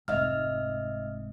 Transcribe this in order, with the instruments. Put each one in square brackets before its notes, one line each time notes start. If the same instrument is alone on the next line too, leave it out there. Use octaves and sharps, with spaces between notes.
[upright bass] F1 G#2 [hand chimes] D#5 E5 F6